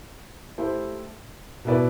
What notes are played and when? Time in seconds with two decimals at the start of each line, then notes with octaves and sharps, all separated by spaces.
0.58 A3 E4 G4 C5
1.65 B2 B3 E4 B4 D5